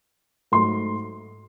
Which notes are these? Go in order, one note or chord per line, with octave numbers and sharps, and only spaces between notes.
G#2 F#3 A3 C6